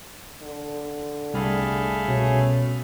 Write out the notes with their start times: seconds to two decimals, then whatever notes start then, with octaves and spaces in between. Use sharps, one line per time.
0.41 D3
1.34 C2 G3 A3 G#4 F5 B5
2.08 B2 C#4